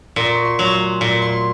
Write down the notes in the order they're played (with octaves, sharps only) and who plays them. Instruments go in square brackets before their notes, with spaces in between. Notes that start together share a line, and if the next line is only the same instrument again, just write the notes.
[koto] A#2 [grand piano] C6
[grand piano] C#6
C6
[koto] F#3
[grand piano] C6
[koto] A#2 [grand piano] C6
[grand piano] C6